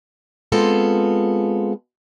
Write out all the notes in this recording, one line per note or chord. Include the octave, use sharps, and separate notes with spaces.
G#3 B3 C4 F4 A4